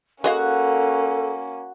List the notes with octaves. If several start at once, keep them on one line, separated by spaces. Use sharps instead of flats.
G#3 A#3 C#4 F#4 A4 D#5 F5